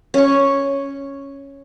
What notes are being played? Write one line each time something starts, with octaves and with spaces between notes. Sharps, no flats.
C#4 C#6